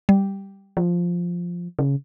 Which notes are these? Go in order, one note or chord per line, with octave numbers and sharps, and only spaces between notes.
G3
F3
C#3